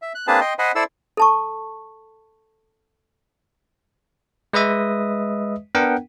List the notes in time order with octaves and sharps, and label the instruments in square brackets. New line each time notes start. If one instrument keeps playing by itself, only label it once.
[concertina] E5
F#6
A#3 C4 D4 G#4 B4 A5
D#5 G5 C6
C5 D#5 F#5 G#5 B5
E4 A4 C5 D5 E6
[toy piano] A4 A5 C#6
[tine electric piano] G#3 B4 D#5 E5 D#6
B3 D4 A#4 F#5 G5